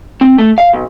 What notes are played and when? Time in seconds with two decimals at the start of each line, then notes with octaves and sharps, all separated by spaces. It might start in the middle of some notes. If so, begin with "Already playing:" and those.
0.21 C4
0.38 A3
0.58 F5
0.73 B1